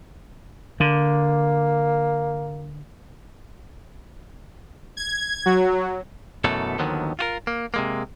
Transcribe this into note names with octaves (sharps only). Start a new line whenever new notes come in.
D3 A#3
G#6
F#3
F#2 B2 E3 F#3 A3 A4
D#2 D3 D#3 F3 F#3 B3
F4 F#4 A#4
A#3
C3 G#3 A#3